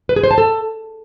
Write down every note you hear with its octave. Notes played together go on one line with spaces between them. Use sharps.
B4
G#4
C5
A5
A4